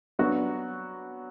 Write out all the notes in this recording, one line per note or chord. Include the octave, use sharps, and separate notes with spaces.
F#3 B3 D4 F#4